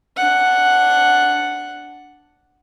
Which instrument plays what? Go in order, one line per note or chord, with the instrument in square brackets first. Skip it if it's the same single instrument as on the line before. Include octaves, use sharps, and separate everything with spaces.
[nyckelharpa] D4 F#5